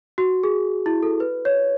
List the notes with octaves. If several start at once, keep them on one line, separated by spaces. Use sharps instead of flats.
F#4
G#4
E4
A4
B4
C#5